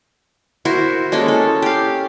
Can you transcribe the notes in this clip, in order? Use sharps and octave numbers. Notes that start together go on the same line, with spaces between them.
E4 F#4 A#4 C5
G#3 A#3 C#4 A4
A4
G4 F5